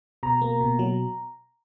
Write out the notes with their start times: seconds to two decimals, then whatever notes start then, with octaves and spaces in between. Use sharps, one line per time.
0.23 B2 A#5
0.41 A#3
0.61 B2
0.79 F#3